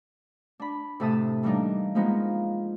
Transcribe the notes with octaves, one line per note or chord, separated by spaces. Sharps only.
D4 B5
A2 C3 A4 E5 A5 D#6
E3 G3 A#3 D4 D#4
F3 G#3 A#3 B3 D#4